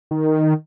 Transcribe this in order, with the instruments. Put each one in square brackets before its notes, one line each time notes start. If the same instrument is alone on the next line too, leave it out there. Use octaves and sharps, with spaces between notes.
[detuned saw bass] D#3